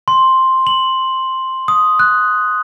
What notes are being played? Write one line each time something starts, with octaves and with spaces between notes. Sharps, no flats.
C6
F#7
D#6
F#6